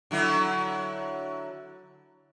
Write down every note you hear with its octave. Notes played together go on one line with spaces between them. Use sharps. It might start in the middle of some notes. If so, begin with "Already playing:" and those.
D3 F#3 E4